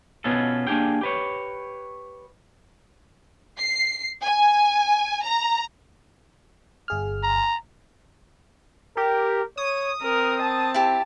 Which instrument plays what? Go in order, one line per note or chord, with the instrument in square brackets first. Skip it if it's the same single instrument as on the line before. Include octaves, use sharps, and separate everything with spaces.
[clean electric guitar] B2 B3 C#4 F4 A4
A#3 D4 G4 G#4 G5
G4 B4 C#5
[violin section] C7
G#5
A#5
[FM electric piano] G1 G#4 F6
[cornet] A#5
[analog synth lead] G4 [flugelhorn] A#4
[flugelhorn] C#5 [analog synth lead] D#6
[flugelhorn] C4 [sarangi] A#4
[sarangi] A5
[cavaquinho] E4 G4